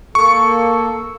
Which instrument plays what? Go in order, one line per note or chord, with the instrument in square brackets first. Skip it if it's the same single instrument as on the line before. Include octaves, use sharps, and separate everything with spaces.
[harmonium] A#3 A4 [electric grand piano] C#6